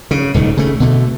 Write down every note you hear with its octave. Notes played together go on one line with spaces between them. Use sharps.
C#3
D#1 C#2 D#3
C#3 A3
B2 D3 A3